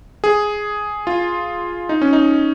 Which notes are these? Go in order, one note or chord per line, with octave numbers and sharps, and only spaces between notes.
G#4
F4
D#4
C#4
D#4